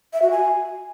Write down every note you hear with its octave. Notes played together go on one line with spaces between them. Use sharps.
E5
F#4
G#5